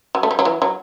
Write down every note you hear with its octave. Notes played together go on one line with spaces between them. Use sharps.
F#3
A3
G3
F#3
E3
F#3